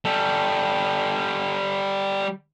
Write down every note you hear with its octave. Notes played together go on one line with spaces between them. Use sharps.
G3 A4